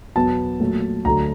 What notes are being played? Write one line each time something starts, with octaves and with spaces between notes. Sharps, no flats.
E2 B2 F#3 B3 A5
A#2 F#3 A3
D2 D3 F#3 A#5